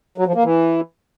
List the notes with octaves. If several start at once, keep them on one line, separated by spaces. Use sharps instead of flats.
F#3
F3
A#3
E3